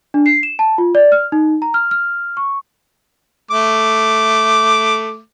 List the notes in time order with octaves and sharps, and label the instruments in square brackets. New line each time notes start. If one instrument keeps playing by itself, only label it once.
[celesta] D4
C7
E7
A5
F4
D5
F6
D#4
A#5
F6
F6
C#6
[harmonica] A3 D6